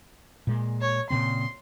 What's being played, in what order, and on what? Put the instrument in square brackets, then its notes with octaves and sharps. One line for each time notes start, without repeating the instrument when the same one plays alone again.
[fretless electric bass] A#2 G#3
[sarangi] C#5
[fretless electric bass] A#2 C#3 C4 [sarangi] C6